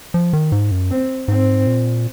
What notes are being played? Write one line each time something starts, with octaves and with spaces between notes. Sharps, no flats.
F3
D#3
G#2
F#2
C4
G#2 C4
A#2